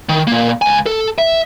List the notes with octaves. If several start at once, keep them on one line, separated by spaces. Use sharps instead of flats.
D#3
A#2 A#3
C#2 G#5
A4
E5